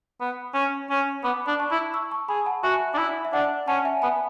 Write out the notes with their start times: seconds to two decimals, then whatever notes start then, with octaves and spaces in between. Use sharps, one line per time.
0.21 B3
0.54 C#4
0.90 C#4
1.24 B3 B5 D6
1.47 D4
1.60 A5 C#6
1.71 E4
1.94 C#6 E6
2.11 A5 C#6
2.28 G#4 G#5 B5
2.46 F#5 A5
2.63 F#4 E5 G#5
2.94 D4
2.98 E4
3.25 E5
3.33 D4 D5 F#5
3.68 C#4 F#5 A5
3.85 E5 G#5
4.02 B3 G#5 B5